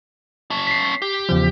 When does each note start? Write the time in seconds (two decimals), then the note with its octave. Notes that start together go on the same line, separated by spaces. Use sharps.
0.51 C#4 A5
0.67 B6 C7
1.02 G4
1.29 E2 C#3 F3